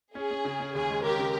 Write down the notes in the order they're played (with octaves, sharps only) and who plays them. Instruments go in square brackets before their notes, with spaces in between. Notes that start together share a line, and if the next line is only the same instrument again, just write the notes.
[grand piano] C#4 [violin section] G#4
[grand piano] C#4
C#3
C#4
[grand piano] D#2 [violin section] G#4
[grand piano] G#3
[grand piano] D#2 [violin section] G4 A#4
[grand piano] C#3